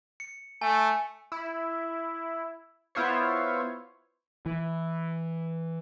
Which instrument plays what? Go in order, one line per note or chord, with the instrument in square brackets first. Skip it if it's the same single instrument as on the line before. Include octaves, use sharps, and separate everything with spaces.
[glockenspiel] C#7
[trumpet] A3 [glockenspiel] G#5
[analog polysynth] E4
B3 E4 F4 C5 C#5
[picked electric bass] E3